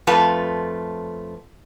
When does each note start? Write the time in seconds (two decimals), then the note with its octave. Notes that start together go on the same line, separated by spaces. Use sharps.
0.07 F2 A3 F4 B4 A5